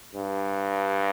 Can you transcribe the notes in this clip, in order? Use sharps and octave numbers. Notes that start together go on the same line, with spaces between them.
G2